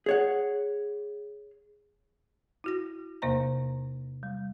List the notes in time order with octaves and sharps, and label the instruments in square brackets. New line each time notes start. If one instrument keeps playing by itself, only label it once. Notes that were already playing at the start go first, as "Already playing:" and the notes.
[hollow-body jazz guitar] G#4 C#5 F#5
[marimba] E4 F#4 A#6
E2 C3 A#3 C5 D#5 A#5
G3